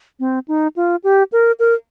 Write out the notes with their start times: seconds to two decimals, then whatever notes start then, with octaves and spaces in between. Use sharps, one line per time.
0.20 C4
0.48 D#4
0.76 F4
1.04 G4
1.32 A#4
1.59 A#4